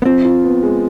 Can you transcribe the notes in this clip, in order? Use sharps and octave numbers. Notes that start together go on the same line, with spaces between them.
B3
F3 C4
F4
B3
G#3